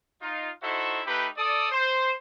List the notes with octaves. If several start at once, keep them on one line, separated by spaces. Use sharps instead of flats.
D#4 F4
D#4 E4 F#4 A4 C5 E5
A3 D#4 G4 B4
A4 D5 D#6
C5